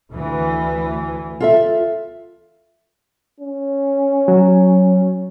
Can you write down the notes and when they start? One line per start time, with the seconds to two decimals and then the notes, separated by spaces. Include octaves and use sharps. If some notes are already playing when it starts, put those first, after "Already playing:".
0.11 D2 E3
1.40 F4 A4 E5
3.40 C#4
4.28 F#3